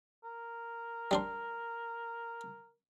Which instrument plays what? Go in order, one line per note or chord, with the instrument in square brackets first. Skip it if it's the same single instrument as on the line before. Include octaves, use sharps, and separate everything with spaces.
[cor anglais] A#4
[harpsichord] G3 D4 C5